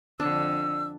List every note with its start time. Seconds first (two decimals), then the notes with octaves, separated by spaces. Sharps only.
0.20 F2 D3 D4 E6